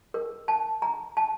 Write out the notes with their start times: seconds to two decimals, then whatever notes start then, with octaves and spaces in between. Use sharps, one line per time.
0.14 A#4
0.48 A5
0.82 A#5
1.17 A5